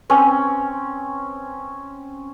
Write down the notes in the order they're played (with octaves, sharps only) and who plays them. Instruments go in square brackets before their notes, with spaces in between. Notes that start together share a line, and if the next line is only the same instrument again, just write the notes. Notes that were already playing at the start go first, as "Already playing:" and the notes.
[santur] C4 C#4